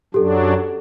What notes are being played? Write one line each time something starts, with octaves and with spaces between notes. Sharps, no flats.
F#2 F#3 D4 G4 A4